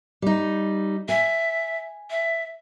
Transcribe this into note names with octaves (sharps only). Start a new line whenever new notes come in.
G3 D#4
E5 G#5
E5